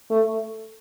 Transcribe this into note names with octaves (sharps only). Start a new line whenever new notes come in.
A3